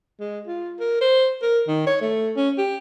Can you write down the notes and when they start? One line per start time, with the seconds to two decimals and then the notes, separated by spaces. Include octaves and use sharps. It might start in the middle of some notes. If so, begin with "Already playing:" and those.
0.20 G#3
0.47 F4
0.80 A#4
1.01 C5
1.42 A#4
1.68 D#3
1.87 C#5
2.01 A3
2.36 C#4
2.58 G4